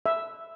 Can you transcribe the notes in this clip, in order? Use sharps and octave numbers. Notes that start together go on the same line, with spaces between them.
E5